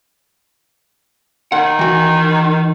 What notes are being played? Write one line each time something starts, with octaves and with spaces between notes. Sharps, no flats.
D#3 F#5
E3 F#4